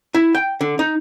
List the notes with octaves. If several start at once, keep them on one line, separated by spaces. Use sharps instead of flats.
E4
G5
D3
D#4